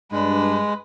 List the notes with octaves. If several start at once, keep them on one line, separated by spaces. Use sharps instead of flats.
G2 G#3 D4 B4